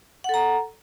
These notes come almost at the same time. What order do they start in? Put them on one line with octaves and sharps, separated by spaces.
F#5 A4 A#5